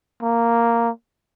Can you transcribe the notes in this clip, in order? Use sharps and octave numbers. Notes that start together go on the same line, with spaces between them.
A#3